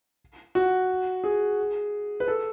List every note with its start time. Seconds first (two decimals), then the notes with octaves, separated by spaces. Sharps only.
0.55 F#4
1.24 G#4
2.20 B4
2.28 A4